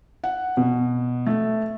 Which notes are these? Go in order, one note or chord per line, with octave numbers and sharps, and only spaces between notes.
F#5
B2
A3